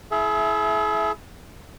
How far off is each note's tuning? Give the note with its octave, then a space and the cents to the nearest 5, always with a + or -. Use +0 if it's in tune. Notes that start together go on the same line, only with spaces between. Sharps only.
E4 +0 G#4 +40 E5 +10